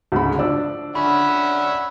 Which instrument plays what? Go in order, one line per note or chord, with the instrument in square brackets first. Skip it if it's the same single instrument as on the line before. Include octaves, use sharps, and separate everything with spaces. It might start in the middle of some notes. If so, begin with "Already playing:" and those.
[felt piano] D2 G#2 C#3 [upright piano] F#4 B5
[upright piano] F3 E6 [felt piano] D4 D5
[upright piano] D3 [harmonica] C#4 E5 F#5 [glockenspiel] B5